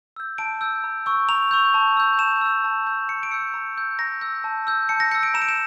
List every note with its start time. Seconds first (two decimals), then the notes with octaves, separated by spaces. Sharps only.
0.16 E6 G6
0.38 A5 D7
0.61 E6 G6
0.84 A#5
1.06 C#6 E6 G6
1.29 A#5 F7
1.51 C#6 E6 G6
1.74 A5
1.97 E6 G6
2.19 A5 E7
2.41 E6 G6
2.64 A5
2.86 E6 G6
3.08 A5 C#7
3.23 D7
3.31 E6 G6 C#7
3.54 A#5
3.77 E6 G6
3.99 A#5 A#6
4.21 E6 G6
4.44 A5
4.67 E6 G6
4.89 A5 C#7
5.00 A#6
5.11 E6 G6 C#7
5.23 D7
5.34 A#5 E7
5.42 D7
5.49 E7